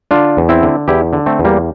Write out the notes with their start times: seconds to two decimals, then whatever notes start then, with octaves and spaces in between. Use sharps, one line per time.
0.11 D3 D4 F4
0.37 E2
0.49 C4 E4
0.63 D3
0.88 E2 E4 G4
1.13 D3
1.26 A3 C4
1.39 E2
1.45 G3 A#3